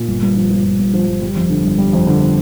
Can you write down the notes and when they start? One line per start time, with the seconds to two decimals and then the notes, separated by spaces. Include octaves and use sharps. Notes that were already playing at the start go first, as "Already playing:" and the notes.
Already playing: A#2
0.08 G1
0.23 G2
0.36 F3
0.50 G1
0.65 G1
0.79 G2
0.94 F3
1.07 G1
1.22 G3
1.36 F2
1.50 D3
1.65 G1
1.78 G3
1.93 F2
2.07 D3